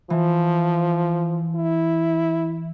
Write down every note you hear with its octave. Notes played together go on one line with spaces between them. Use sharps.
E3 F3
E4